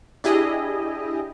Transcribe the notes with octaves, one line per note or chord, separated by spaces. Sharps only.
D4 E4 G4 G#4 D#5